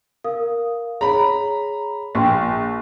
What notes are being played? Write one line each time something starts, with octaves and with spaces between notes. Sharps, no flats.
A#4 F5 D#6
G#4 C#5 A#5 B5
A#1 G5 C6 C#6